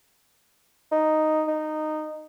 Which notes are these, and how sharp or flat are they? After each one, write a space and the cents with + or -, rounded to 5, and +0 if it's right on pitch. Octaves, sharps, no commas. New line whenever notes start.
D#4 +0
D#4 -15